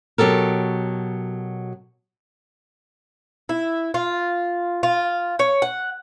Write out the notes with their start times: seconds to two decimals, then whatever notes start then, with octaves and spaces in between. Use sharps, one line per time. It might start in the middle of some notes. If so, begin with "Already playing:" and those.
0.18 B2 F#3 G4 A4 A#4
3.49 E4
3.94 F4
4.83 F4
5.39 C#5
5.62 F#5